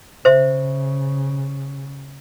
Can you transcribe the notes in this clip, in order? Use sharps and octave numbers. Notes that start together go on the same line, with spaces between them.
C#3 C5 E5